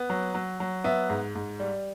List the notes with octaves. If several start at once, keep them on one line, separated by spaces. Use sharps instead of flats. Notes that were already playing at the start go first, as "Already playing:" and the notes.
Already playing: B3
F#3
F#3
F#3
B3 E5
G#2
G#2
G3